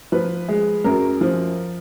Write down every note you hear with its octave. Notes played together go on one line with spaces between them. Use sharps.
F3 B4
G#3
F#2 A#4
F3